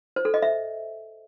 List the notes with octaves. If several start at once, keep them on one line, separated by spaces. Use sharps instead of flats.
C5
A4
D#5
E5